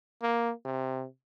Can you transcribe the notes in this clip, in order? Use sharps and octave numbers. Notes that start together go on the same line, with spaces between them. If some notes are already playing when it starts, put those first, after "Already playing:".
A#3
C3